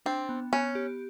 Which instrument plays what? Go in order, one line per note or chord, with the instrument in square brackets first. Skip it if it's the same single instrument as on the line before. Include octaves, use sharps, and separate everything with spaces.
[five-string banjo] C4 [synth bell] D4
[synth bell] B3
[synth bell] B3 [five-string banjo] C#4
[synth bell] G4